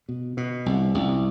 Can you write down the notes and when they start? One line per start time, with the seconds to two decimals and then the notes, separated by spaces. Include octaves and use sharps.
0.09 B2
0.37 B2
0.66 C2
0.94 C2